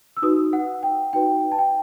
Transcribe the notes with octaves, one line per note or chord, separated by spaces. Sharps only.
E6
D#4 F#4 B4 D#6
F#5
G5
D#4 F#4 B4 G5
A5
G5